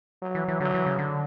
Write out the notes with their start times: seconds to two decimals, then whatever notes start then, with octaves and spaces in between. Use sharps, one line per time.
0.22 F#3
0.35 E3
0.48 E3
0.60 D3 F#3
0.74 E3
0.86 C#3
0.98 D3